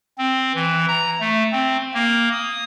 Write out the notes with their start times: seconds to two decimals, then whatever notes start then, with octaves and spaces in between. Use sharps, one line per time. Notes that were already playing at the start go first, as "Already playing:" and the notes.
0.18 C4
0.55 E3
0.88 A#5
1.20 A3
1.52 C4
1.94 A#3
2.32 D#6